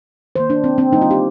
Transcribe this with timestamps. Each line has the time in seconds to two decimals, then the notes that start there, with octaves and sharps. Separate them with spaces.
0.36 D#3 A#3 C5
0.50 D4
0.64 C4
0.78 C4
0.92 D3 G3 A#3 D#4
1.02 F4
1.11 G4